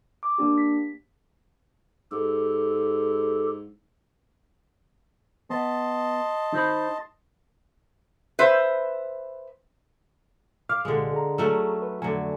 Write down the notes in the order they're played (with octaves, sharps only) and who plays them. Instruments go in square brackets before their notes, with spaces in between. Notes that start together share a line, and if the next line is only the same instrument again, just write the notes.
[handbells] D6
A#3 D4 G4
B6
[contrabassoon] G#2 [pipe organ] G4 A4
[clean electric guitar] B3 [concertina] D#5 A5 C6
[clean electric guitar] D#4 C5 B5
[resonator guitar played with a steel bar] B4 C5 E5
[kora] F5 [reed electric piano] D6 F6
[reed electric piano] C2 A#2 G4 [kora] D3 G#3
[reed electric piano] G#4 A#5
[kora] F#3 A3 C#4
[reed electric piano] B4
[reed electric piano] F2 A3 G#5 [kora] D3 F#3